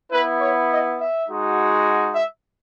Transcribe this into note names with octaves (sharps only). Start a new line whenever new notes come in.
B3 E4 B4
C#5
D#5
E5
G#3 D#4 F#4
E5